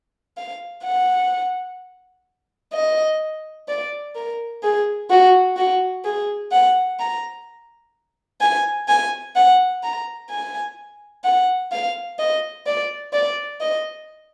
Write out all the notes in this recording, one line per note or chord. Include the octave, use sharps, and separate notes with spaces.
F5
F#5
D#5
D5
A#4
G#4
F#4
F#4
G#4
F#5
A#5
G#5
G#5
F#5
A#5
G#5
F#5
F5
D#5
D5
D5
D#5